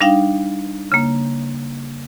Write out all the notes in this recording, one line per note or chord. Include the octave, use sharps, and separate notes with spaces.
G3 D4 D#4 F5 G5
C#3 A#3